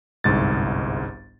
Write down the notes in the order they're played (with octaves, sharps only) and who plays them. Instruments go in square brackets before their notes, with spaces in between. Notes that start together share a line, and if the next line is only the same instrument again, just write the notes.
[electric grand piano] G1 C2 G#2 A6